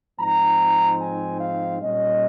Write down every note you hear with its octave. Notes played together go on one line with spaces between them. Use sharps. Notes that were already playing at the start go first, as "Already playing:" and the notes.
G#2 F3 C4 D#4 A#5
G#5
F5
A#2 G3 C#4 D#5